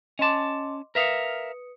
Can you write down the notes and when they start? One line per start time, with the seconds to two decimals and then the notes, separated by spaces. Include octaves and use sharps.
0.19 C#4 D#5 A5 C6 D6
0.95 A#4 B4 E5 F5 D#6 C#7